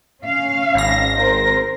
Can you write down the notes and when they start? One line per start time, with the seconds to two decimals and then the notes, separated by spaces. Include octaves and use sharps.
0.23 C#4 F5
0.74 G#1 A#6
1.16 C4 A#4 C5